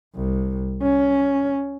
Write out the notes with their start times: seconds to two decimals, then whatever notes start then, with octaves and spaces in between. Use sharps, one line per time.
0.16 C2
0.82 C#4